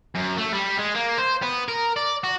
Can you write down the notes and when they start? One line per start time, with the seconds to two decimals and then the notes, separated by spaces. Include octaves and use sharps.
0.15 F#2
0.38 A3
0.54 G3
0.79 G#3
0.95 A#3
1.18 C5
1.42 B3
1.68 A#4
1.96 D5
2.24 F#4